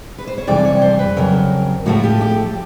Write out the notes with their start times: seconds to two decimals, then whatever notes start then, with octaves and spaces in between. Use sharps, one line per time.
0.18 B4
0.27 C5
0.38 C#5
0.47 F2 C3 E3 G3 D5
0.65 C#5
0.82 C5
0.99 B4
1.17 F2 C#3 F#3 A#4
1.86 A2 F3 A3 F#4
2.03 G4
2.21 G4